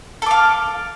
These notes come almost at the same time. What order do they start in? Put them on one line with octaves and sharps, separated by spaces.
A4 D6 F5